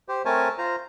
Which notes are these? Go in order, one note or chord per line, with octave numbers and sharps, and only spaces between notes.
G4 C5
A3 C4 A#4 C#5 G#5 A5
F4 C5 A#5